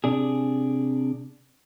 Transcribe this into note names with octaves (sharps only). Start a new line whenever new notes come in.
C3 D4 G#4